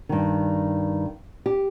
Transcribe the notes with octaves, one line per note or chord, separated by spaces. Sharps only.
G2 D#3
G4